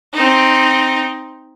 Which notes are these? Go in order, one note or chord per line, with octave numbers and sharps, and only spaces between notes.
C4 D#4